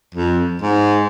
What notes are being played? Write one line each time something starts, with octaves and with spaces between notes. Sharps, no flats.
F2
G#2